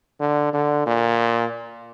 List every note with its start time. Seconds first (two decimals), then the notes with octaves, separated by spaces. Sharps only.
0.20 D3
0.53 D3
0.86 A#2